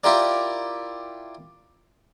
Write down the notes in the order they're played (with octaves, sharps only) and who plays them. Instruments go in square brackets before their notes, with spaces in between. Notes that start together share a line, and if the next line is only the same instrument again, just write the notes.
[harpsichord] E4 F4 G4 A#4 D5